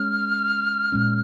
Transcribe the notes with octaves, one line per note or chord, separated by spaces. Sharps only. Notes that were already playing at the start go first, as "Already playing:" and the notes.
Already playing: G#3 C#4 F6
A#2 G#3 C#4